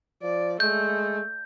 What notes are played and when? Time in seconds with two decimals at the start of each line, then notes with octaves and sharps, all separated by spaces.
0.22 F3 D5
0.60 G#3 A3 G6